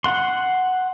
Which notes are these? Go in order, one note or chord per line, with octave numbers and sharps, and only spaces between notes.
F#5 C6